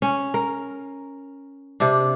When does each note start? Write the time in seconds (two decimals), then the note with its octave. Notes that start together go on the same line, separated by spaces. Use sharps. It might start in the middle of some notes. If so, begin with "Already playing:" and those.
0.02 C#4
0.34 A#4
1.80 C3 D4